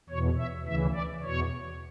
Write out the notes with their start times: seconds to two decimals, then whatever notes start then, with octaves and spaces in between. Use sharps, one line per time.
0.10 E2 B2 C#5
0.38 E5
0.66 D2 C#3 E3 E5
0.94 D5
1.23 E2 B2 C#5